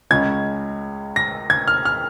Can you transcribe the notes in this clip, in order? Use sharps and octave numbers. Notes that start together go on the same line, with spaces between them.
C#2 C#3 G#3 C#4 G#6
A#6
G#6
F6
F6